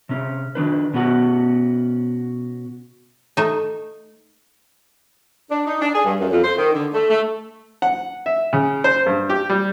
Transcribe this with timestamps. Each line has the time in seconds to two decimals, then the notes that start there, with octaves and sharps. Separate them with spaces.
0.09 C3 C#4
0.55 D#3 D4 B4
0.93 B2 B3 C#4 F#4 F#5
3.37 A3 D#4
5.51 D4
5.67 D#4
5.81 D4
5.94 G#4
6.05 G2
6.20 F#2
6.31 F2
6.43 C5
6.57 D#3
6.73 D3
6.94 A3
7.10 A3
7.82 F#5
8.26 E5
8.53 C#3
8.84 C5
9.06 G2
9.30 G4
9.50 G3